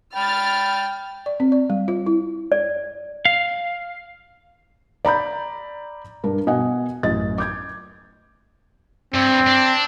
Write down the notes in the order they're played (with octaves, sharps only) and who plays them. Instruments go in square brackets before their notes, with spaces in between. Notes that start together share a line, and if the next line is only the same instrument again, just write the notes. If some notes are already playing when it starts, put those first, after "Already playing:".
[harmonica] G5 B5 [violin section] F6 A6
[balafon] D5
C4
D5
G3
F4
E4
[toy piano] D5
[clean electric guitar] F5
[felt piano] D5 A#5 B5 G6
G2 D4 A#4
B2 D#5 F#5 G#5
A1 F#2 F#4 D#5 A6
D6 G6 G#6
[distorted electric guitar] G2 [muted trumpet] C4
[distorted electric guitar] D4